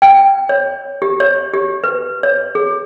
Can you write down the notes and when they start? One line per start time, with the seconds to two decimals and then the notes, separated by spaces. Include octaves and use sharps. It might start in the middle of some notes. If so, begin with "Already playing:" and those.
0.02 G5
0.49 C#5
1.02 G4
1.20 C#5
1.54 G4
1.84 B4
2.23 C#5
2.55 G#4